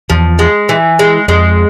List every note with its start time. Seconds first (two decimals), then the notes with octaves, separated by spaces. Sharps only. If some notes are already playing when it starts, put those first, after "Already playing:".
0.10 E2 F3
0.39 G#3
0.69 E3
0.99 G#3
1.28 F2 G#3